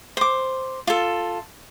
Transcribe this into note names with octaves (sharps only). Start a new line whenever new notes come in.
C5 D6
F4 A4